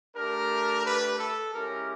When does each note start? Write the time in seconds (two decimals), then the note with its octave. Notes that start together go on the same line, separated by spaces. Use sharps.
0.15 A3 D4 G4 A#4
0.84 B4
1.18 A4
1.51 G#3 C#4 E4 G4 A#4